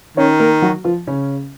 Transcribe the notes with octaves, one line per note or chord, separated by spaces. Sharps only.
D#3 C#4 C#5
A#3 A#4
F#3 F#4
F3 F4
C#3 C#4